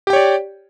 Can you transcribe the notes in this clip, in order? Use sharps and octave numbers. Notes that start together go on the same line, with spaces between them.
G4 C#5 D5 G5